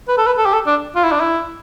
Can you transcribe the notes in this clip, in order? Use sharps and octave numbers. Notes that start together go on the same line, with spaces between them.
B4
A4
B4
A4
G4
A4
D4
F4
E4
D4
E4